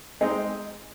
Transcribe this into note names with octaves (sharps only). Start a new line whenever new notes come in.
G#3 C4 D#4